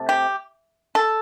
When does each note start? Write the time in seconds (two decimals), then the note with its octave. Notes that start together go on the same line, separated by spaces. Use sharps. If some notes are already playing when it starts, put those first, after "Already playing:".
Already playing: C3 A3
0.09 G4
0.95 A4